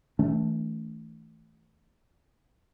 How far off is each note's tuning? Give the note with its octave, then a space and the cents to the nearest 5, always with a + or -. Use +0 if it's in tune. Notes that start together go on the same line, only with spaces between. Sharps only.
E3 -40 A3 +0 C#4 +35